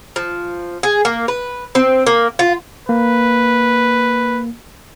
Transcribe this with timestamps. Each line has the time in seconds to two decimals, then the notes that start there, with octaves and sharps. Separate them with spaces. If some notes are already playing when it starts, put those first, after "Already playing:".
0.16 F3
0.83 G#4
1.05 A#3
1.28 B4
1.75 C4
2.07 A#3
2.39 F4
2.89 A#3 B4